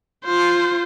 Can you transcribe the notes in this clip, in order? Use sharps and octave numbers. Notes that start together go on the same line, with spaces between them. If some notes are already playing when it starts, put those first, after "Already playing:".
F4 C5